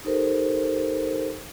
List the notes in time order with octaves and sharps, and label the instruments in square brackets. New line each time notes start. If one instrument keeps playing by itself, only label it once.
[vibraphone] D#4 G4 A4 A#4 C5